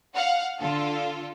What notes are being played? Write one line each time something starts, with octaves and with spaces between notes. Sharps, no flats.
F5 F#5
D3 F4 A4